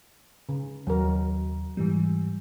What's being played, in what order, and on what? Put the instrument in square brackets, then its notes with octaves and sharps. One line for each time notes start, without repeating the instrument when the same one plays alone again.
[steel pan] C#3
[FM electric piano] D#2 [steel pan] F#3 A#4
[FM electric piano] G#2 E3 G3